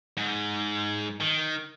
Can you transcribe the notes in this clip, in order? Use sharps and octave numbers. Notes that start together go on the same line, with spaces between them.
G#2
D#3